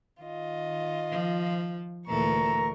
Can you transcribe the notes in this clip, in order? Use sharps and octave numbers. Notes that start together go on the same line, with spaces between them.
D#3 F4 D#5
F3
D2 A#2 E3 A4 A#4 A#5 C#6